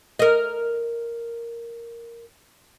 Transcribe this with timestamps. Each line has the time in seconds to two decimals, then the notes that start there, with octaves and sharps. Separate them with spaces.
0.19 A#4 D#5